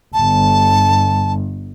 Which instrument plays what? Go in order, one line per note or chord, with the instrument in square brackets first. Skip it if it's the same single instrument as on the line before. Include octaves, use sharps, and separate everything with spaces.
[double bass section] G1 [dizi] A5